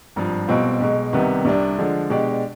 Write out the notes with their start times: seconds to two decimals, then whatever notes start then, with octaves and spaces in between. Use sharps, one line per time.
0.16 G#1 G2 F3
0.48 B1 B2 G3 C4 F4
0.80 B1 B2 G#3
1.13 C2 C3 D#3 G3 B3
1.45 C2 C3 G3 D4
1.78 D3 F3 G#3 D4
2.10 B2 G#3 D4 G4 D5